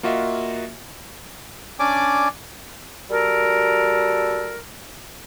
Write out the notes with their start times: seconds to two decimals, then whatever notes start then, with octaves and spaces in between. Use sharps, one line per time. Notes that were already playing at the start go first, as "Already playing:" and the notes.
0.03 A#3 F4 F#4 D#5 E5
1.79 C#4 D4 D5 G#5 D6
3.10 G3 F#4 A4 A#4